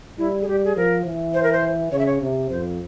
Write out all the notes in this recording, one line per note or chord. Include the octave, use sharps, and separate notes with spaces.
G3 E4
G#4
G3 G4
G#4
F3 A#4
E3
C5
A#4
C5
C#3 C#5
E5
C#5
C3
F2 C5